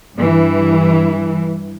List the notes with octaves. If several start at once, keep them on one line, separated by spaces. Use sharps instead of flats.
G2 E3